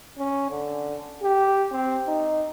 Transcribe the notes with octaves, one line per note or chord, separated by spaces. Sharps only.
C#4
D3
G4
C4
D#4